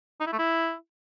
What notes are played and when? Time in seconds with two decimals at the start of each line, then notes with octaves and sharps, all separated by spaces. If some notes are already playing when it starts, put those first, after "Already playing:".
0.21 D#4
0.27 E4
0.33 A3
0.39 E4